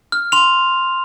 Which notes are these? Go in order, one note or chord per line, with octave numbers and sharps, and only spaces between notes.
F6
C6 F7